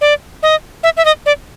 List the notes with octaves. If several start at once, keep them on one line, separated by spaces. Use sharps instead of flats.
D5
D#5
E5
E5
D#5
D5